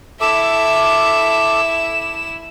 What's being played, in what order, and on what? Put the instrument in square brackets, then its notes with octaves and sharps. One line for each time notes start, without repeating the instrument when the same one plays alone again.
[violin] E4 E7 [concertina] A4 D6 [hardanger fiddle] E5